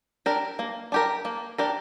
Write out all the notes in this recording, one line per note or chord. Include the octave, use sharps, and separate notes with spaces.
D4 G4 A#4
A#3
D4 G4 A#4
A#3
D4 G4 A#4